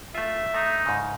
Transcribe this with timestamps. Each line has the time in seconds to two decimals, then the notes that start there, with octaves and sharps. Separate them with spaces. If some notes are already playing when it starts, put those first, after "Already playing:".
0.15 A3 F4 E5
0.54 A3 D#4
0.86 G#2 C#3